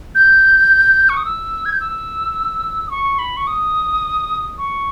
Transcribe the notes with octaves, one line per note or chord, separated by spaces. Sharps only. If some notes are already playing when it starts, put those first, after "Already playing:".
G6
C#6
D#6
E6
G#6
G6
E6
D#6
C#6
B5
C#6
D#6
C#6